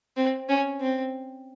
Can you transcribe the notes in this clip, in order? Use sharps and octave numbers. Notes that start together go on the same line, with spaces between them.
C4
C#4
C4